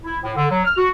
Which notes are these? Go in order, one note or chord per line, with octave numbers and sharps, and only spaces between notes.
E4
A2
D3
F#3
F6
F#4